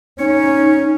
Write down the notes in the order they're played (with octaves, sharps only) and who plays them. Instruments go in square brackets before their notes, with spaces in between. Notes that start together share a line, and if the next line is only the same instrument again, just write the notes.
[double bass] C#4 [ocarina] D#4 [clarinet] C#5